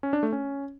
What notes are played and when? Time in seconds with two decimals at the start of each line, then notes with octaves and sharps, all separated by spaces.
0.03 C#4
0.13 D4
0.23 A3
0.33 C#4